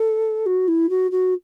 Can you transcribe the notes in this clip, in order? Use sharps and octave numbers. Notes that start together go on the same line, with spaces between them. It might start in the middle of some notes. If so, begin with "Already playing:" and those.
Already playing: A4
F#4
E4
F#4
F#4